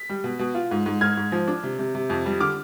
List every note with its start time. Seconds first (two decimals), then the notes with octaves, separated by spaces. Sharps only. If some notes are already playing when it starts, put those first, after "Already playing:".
Already playing: B6
0.09 G3
0.24 B2
0.39 B2
0.55 F4
0.71 G#2
0.86 G#2
1.01 G#2 F6 G#6
1.17 G#2
1.32 F3
1.48 D4
1.63 C3
1.79 C3
1.95 C3
2.10 F2
2.26 G3
2.40 D3 D6 F6